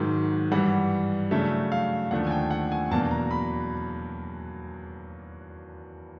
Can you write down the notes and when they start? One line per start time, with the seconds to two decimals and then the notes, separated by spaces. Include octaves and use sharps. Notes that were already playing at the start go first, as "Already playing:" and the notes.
Already playing: G#2 D#3 F#3
0.51 G2 E3 G3 F#5
1.31 C#3 F#3 A3 D4 E5
1.72 F5
2.11 D#2 D3 F3 A3 D4 F#5
2.27 G#5
2.31 G5
2.51 F#5
2.72 G#5
2.91 E2 B2 F#3 A#3 D4 A5
3.11 A#5
3.31 B5